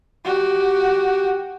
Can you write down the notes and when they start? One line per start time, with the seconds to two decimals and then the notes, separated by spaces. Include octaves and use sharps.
0.25 F#4 G4